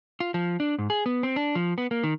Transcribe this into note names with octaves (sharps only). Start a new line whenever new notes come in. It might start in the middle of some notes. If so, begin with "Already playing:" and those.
F4
F3
D4
G#2
G#4
B3
C4
D4
F3
B3
A#3
D#3